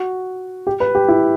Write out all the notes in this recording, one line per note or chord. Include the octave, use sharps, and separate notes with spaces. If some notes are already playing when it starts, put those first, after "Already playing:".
Already playing: F#4
G4
B4
G4
E4